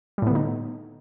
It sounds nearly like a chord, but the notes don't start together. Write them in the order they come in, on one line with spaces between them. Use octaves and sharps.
G3 A2 B3 D3 D#4